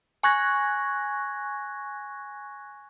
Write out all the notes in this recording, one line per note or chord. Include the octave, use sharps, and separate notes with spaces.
G#5 C#6 F#6 G#6 A#6